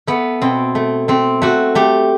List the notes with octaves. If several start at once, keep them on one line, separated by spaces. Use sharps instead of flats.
A3 B3
B2 C4
A3
A3 C4
A3 F#4
A3 G4